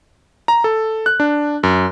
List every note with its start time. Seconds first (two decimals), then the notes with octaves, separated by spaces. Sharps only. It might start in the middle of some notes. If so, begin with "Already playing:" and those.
0.48 A#5
0.64 A4
1.06 F#6
1.20 D4
1.63 F#2